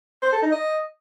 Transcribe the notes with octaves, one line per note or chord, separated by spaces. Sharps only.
C5
A4
D#4
D#5